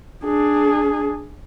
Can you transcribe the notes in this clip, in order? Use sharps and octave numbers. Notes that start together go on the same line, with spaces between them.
D4 G#4